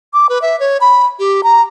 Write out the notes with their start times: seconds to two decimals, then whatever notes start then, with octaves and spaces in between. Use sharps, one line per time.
0.14 D6
0.29 B4
0.42 E5
0.60 C#5
0.81 B5
1.19 G4
1.43 A#5